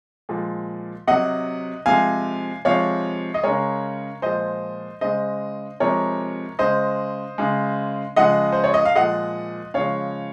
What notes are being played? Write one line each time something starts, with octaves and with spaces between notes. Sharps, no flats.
A#2 F3 G#3
C3 F#3 D#5 F#5
C3 F3 G#3 F5 G#5
C3 F3 G#3 C#5 F5
D#5
C#3 G#3 A#4 C#5
A#2 F3 G#3 C5 D#5
C#3 G#3 C5 D#5
C3 F3 G#3 A#4 C#5
C#3 G#3 C5 D#5
C#3 G#3
C#3 F3 G#3 D#5 F#5
C5
C#5
D#5
F5
A#2 F3 G#3 D#5 F#5
C#3 F3 G#3 C#5 F5